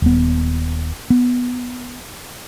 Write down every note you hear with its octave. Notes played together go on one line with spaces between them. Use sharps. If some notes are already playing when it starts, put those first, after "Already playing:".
D#1 B3
B3